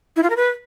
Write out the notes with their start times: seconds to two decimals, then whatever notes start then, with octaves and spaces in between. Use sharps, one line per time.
0.16 E4
0.23 F4
0.30 A#4
0.37 B4